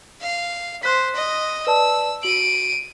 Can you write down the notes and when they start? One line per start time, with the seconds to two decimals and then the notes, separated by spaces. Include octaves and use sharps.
0.22 F5
0.83 C5 C6 F#6 B6
1.16 D#5 A#6
1.67 B4 D5 A5 E6
2.23 F#4 D7 D#7 F#7